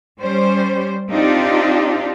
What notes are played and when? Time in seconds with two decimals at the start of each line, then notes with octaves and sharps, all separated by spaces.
0.20 G3 C#4 C5
1.11 C4 D4 D#4 F4 G4